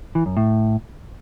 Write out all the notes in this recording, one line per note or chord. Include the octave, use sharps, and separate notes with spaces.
E3
F#2
A2